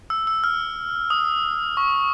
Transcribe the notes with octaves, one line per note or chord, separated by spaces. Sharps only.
E6
E6
F6
D#6
C#6